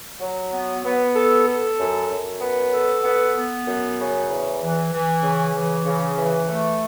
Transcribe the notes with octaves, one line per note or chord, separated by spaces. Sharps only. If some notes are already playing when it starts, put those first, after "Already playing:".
F#3
B3
B3
A4
A4
F#2
F#2
B3
A4
B3
B3
F#2
C#3
E2
E3
E3
C#3
E3
C#3
E3
A3